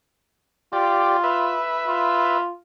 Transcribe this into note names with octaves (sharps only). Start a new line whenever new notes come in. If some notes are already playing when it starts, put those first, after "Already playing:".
F4 G4 D5
B4 E5
F4